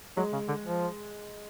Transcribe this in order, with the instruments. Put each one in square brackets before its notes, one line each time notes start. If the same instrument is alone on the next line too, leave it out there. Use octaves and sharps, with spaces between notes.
[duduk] F#3 [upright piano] G#3
[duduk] C#3
D3
F3